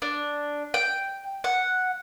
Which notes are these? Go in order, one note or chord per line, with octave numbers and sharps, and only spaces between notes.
D4
G5
F#5